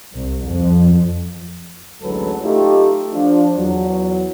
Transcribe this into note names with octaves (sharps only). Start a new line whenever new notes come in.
C2
F2
A1 D2 F#3 G#3 A4 B4
A3 D#4 F4 G4
F3 D4
E2 F#3